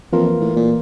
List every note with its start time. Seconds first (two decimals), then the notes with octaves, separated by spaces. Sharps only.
0.12 F2 E3 A#3 F4 A#4
0.41 A2
0.56 A#2